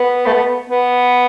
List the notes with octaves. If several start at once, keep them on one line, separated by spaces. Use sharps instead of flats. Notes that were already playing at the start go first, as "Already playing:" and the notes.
Already playing: B3
A3
B3
B3